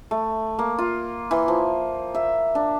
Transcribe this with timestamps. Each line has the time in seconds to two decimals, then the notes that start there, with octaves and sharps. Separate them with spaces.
0.11 A3
0.59 A#3
0.78 F4
1.31 E3
1.48 F3
2.15 E5
2.55 D4